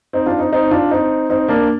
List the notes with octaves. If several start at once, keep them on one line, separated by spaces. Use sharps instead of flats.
C4 D#4
D4 F4
C4 D#4
C4 D#4
D4 F4
C4 D#4
C4 D#4
A#3 D4